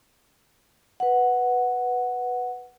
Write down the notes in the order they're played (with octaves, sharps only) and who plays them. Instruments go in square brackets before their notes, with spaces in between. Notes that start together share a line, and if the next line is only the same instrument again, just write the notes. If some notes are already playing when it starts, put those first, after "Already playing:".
[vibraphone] B4 F#5